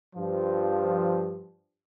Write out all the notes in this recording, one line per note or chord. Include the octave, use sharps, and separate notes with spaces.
G2 F3